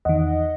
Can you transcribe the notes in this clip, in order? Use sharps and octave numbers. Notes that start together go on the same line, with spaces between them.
E2 D#3 D#5 F#5